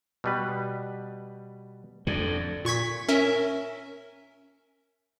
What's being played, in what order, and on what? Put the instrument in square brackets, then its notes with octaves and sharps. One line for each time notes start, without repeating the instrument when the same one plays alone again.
[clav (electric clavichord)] B2 G3 B4
[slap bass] F2 D3
[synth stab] A#2 C#6 G#6 B6
C#4 A#4 E5